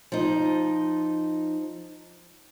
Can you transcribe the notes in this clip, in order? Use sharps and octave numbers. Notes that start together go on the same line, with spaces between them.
F3 D#4